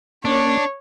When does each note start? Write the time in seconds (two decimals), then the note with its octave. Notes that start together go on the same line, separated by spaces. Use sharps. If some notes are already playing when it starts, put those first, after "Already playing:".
0.25 A#3 C#4 D4 C#5